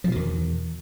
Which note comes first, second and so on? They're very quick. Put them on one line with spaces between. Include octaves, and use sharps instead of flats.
F3 B2 D#3 E2